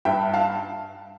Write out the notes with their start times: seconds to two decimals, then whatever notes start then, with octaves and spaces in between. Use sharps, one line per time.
0.05 G2 E5 G5
0.34 F5 A5